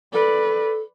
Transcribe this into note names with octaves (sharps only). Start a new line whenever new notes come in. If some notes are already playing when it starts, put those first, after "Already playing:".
A4 B4 D5